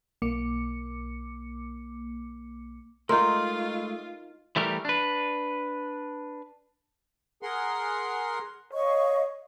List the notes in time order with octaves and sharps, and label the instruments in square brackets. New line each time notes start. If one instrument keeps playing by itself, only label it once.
[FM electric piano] B1 A#3 D6 C#7
[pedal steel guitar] G#3 A3 [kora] D#4 A#4 [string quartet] F4 [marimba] C6
[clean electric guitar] E3 G3 A3 G4 A#4
D4 B4
[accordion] G#4 A#4 F#5 C6
[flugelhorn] C#5 [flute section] D#5 F5 C#6